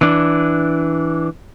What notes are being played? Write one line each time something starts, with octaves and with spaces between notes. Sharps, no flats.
E3 D4